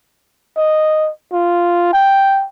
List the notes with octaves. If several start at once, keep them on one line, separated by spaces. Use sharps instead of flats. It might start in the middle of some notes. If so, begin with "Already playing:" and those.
D#5
F4
G5